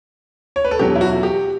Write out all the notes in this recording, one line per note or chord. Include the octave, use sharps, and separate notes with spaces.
C#5
B4
A4
E2 B2 F#3 G4
E4
F#4
G4